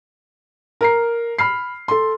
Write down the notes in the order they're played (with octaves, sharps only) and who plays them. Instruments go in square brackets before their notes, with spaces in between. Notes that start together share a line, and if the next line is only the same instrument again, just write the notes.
[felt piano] A#4 A#5 C7
B5 F6 C7
A4 C6